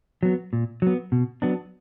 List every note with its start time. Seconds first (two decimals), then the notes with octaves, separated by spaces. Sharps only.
0.23 F#3 B3
0.53 A#2
0.82 F#3 B3
1.12 B2
1.42 F#3 B3 D4